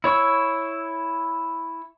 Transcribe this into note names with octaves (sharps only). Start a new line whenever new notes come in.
E4 C#5 C#6 E6